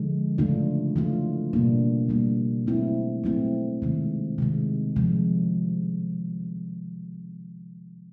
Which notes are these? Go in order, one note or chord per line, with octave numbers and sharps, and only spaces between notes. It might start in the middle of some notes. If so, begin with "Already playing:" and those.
Already playing: D3 F3 G#3
C#3 E3 A3 D4 F4
C#3 E3 A3 D4 F4
B2 G3 A#3 D4
B2 G3 A#3 D4
F#3 A3 C4 E4
F#3 A3 C4 E4
C3 D#3 G#3
C3 D#3 G#3
C3 F3 G#3